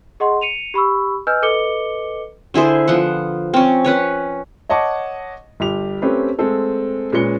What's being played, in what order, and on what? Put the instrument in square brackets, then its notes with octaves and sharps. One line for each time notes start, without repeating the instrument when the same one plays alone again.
[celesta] G#4 D#5 F#5 C6
C#7 D#7 F7
G4 B5 C#6 E6
B4 D#5 G#5 E6 F6 G6
A4 B4 D#5 D6 C#7 G7
[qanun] D3 E4 G#4 C5
F3 B3 F#5
C4 C#4
C#4 B4 C#5
[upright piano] C#5 D#5 F#5 A5 C#6 D6
G1 G4 F7
A3 C4 C#4 G4 B4
G#3 A3 C4 A4
A#2 G#3 C#4 B4 C#7 G7